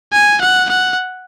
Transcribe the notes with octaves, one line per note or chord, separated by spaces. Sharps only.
G#5
F#5
F#5